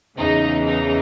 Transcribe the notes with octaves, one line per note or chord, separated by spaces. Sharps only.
E2 C#3 E3 D#4
D#4